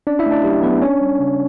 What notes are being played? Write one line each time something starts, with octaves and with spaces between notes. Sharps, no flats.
C#4 D4 D5
E4 E5
A3
D4 D5
F#3 G4
F#3 B3 B4
C#4 D4 C#5
G3
C#3